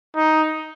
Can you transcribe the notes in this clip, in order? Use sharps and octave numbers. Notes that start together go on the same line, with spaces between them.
D#4